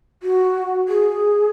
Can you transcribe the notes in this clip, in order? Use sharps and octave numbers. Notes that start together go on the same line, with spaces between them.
F#4
G#4